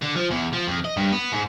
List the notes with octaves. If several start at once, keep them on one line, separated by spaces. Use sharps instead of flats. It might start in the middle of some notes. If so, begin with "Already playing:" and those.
D3
F3
E2
F3
F2
D#5
G2
B3
G#2